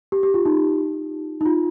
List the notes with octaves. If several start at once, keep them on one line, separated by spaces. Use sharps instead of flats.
G4
G4
F4
D#4
D#4
F4